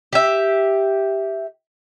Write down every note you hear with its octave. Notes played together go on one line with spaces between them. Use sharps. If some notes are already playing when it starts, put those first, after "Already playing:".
G4 E5